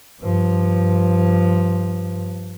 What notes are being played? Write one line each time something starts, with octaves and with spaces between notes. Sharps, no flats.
G2 F3